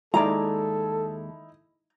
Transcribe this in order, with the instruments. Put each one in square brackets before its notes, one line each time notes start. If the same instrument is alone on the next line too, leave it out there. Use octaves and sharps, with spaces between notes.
[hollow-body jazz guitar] D#2 G#3 D5 [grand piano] D#4 E4 [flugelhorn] A4 [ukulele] A#5